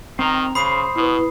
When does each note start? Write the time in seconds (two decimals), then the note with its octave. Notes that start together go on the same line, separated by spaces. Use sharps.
0.19 D#3 C4 A#5
0.55 C#3 C5 B5 D#6 C7
0.96 B2 E4 B4